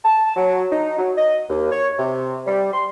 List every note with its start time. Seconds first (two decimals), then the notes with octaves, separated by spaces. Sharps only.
0.04 A5
0.36 F#3
0.70 D#4
0.98 F#3
1.17 D#5
1.49 D#2
1.72 C#5
1.99 C3
2.46 G3
2.73 C6